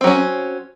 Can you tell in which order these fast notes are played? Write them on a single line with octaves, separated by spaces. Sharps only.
C4 F#3 C#4